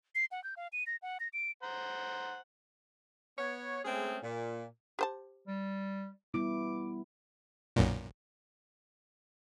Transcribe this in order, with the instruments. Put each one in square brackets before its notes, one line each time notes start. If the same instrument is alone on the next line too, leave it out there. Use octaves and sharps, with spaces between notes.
[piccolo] C7
F#5
G6
F5
D#7
A#6
F#5
A#6
D7
[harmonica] C5 F#5 A#5
[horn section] B3 C#5
G#3 A3 C4 C#4 G#4
A#2
[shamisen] G4 C5 A5
[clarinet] G3
[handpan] G3 B3 E4 [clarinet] D6
[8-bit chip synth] B1 F#2 A#2